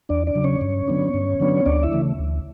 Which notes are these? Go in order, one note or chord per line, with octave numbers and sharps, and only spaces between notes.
E2 D4 D5
D4 D5
C#3 F#3
C#4 C#5
G2
D3 F#3 B3 D4
G2
D3 F#3 B3 D4
D2 D4 D5
E4 E5
C#3 E3 A3
D2